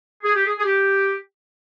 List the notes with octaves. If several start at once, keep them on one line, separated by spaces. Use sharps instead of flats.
G#4
G4
G#4
G#4
G4